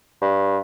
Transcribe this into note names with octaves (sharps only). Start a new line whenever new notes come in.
G2